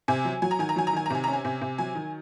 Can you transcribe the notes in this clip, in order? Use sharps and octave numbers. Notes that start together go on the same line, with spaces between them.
C3 G#5
F#3
F#3 G#5
A#5
D#3 G#5
A#5
F#3 G#5
A#5
D#3 G#5
A#5
C3 G#5
A#5
C#4
G#5
C3
C3
F#3 G#5
D#3